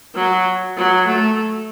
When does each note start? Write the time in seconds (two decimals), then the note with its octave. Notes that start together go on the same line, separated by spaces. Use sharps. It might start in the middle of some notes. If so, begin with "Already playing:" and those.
0.15 F#3
0.77 F#3
1.07 A3